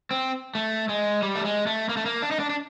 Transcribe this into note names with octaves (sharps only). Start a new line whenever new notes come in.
C4
A3
G#3
G3
A3
G#3
A3
A#3
A3
A#3
D4
D#4
D4
D4